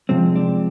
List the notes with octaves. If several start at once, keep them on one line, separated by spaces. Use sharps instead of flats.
C3 F3 G#3 C4
D4